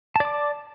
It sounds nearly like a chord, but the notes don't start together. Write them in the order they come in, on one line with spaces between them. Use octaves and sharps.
A5 D5 D6